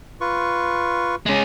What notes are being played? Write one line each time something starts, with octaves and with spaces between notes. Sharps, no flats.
F4 B4 C#6
G#3 C#4